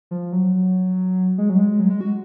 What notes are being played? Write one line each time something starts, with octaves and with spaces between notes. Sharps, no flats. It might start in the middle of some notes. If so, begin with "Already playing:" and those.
F3
F#3
G#3
F#3
G#3
F#3
G#3
F#4